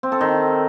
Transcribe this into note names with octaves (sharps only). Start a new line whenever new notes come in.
C4
A4
D#3